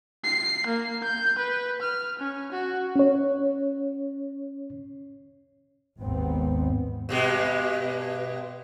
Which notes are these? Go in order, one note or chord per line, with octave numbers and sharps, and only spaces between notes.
C7
A#3
G6
B4
F6
C#4
F#4
C#4 C#5
G#1 D#2 G#2 B3 C4
G2 B2 G#3